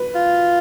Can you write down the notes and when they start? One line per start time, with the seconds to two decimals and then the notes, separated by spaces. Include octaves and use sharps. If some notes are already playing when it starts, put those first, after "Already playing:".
Already playing: B4
0.15 F4